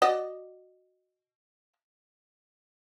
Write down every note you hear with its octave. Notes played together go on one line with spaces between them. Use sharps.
F#4 D5 D#5